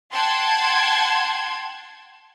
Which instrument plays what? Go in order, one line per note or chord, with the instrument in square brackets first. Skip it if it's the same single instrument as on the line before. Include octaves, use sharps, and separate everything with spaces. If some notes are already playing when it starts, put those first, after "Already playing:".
[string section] F#5 G5 A5 C6 G#6